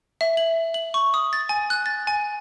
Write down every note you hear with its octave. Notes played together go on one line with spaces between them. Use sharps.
E5
F#7
F#7
C#6
D#6
A6
G#5
F#6
A6
G#5